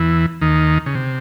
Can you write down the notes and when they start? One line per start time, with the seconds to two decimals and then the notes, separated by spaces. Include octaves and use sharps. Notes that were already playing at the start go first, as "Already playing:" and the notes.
Already playing: E2 E3
0.41 D#2 D#3
0.86 C#3
0.95 C3